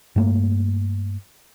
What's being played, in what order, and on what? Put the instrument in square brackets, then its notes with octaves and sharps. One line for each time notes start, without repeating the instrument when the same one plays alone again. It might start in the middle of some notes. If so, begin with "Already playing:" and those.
[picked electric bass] G2 A3 A#3